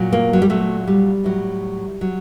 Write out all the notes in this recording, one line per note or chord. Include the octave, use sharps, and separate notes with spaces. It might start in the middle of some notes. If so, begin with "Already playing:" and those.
Already playing: A#2 F#3
A#3
F#3
G3
A#2 F#3 A3
G3
A2 F#3
F#3